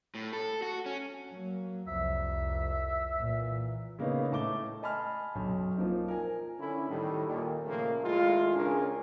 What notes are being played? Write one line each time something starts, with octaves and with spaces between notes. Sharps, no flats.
A2
A4
F#4
C#4
F#3 A#3
C2 F2 E5
A#2 E3
C#3 A#3 B3 D#4 C#5
A2 A3 A5 D6 G7
D#5 G#5 A5 B5 C6 F6
B1 F#2 B2
F3 A#3 C4 D#4
A#4 G#5
D3 C#4 E4
A2 D#3 G3
D#2 A#2 D#3
A#2 C#3 F3 A3 A#3
G#1 G#3 A3 E4 F4
C#2 A2 C#4 D4 G#4 A#4